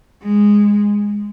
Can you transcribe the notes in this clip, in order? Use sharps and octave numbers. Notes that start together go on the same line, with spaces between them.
G#3